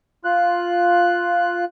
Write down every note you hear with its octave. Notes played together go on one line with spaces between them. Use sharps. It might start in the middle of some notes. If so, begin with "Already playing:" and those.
F4 F#6